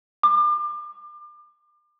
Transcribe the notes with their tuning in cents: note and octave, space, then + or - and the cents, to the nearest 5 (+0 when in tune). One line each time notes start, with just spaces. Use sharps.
D6 +35